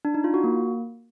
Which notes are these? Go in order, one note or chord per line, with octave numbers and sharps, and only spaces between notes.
D4
D#4
F4
F#4
A#3